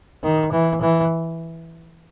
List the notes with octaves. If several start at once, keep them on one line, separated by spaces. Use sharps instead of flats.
D#3
E3
E3